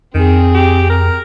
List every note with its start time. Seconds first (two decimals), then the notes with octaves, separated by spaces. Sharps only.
0.15 F2 D#3 C4 G#4
0.54 G4
0.89 A#4